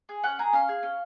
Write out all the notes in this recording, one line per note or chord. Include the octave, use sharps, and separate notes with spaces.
G#4
C#4 F#5
G#4 A#5
C#4 F5
G#4
C#4